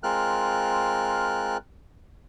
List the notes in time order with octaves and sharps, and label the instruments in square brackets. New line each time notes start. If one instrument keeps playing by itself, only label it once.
[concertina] G#3 C4 F4 A#4 F6 F#6